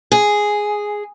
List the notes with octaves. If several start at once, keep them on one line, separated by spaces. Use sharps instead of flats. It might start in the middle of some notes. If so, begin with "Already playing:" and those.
G#4